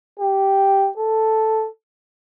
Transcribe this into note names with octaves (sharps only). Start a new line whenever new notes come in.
G4
A4